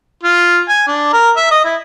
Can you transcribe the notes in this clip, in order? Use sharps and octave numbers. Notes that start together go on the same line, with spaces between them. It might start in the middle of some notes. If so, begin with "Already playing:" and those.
F4
G#5
D4
A#4
E5
D#5
E4